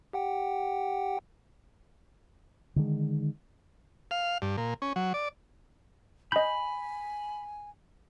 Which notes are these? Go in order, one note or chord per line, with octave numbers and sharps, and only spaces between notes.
G4 F#5 G5
D3 D#3 G#3
F5
G2
A#2
C#4
F#3
D5
D#5 G#5 B5 G6